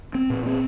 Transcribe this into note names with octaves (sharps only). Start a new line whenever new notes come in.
C4
A#2
C4